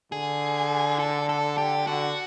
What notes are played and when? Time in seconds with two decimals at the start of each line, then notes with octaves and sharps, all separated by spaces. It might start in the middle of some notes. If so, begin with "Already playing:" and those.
0.12 D3 G#4
0.99 A4
1.29 A4
1.58 G4
1.87 D3 F#4